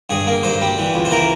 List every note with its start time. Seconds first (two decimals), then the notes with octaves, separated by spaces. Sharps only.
0.10 G2 G#4
0.27 A#3
0.43 G2 C5
0.61 G3
0.78 E3
0.94 C#2
1.05 C5
1.11 E3 A#4